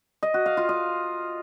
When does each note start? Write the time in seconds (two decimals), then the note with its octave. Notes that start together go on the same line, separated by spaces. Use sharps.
0.23 D#5
0.34 F#4
0.46 F5
0.57 F4
0.69 D#5